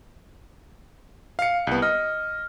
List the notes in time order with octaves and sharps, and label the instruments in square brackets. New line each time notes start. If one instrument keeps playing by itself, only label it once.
[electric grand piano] F5 C#7
C2 B3
[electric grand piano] D#5 [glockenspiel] F6